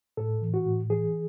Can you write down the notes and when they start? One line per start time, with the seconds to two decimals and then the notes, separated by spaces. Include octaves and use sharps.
0.17 A2 A4
0.42 E3
0.54 F#4
0.66 A2
0.90 E3 G#4